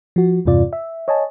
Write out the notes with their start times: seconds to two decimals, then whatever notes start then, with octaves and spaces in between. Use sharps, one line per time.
0.16 F3 F#4
0.45 E2 G2 C3 F4 D5
0.73 E5
1.08 C#5 D#5 G#5 A5